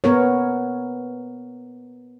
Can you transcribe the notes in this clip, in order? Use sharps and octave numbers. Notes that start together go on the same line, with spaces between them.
B3 A#4 C#5